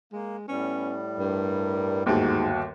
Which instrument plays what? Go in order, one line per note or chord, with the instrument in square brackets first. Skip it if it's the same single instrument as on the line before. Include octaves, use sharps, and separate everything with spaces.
[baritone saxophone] G#3 [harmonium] A#3
[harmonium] A2 G3 [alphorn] B3 [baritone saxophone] C#4
[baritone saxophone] G2 [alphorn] A#4
[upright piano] G1 D#2 [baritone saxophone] G#2 [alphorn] F#4